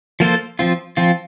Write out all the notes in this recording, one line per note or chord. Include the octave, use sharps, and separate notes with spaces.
F3 A#3 F4 A4 C5
F3 C4 F4
F3 C4 F4